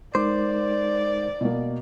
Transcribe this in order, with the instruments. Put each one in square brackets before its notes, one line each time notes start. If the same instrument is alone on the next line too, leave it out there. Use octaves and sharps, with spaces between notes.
[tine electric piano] G#3 D#4 A#4 [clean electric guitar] C5 [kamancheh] D5 [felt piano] D6
[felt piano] B2 A#3